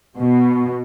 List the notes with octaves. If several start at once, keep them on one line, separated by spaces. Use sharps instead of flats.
B2